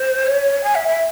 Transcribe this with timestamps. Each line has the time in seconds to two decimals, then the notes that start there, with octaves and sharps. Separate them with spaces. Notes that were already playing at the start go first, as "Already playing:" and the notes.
Already playing: C5
0.27 C#5
0.64 G#5
0.75 E5
0.88 E5